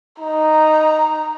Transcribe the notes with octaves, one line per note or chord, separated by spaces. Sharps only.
D#4 A#5